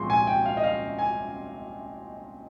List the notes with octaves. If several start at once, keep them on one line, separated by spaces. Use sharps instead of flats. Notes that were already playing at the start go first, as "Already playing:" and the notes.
Already playing: C2 A#2 F3 G#3 C4 C6 C#6
G#5
G5
F5
D#5
F5
G#5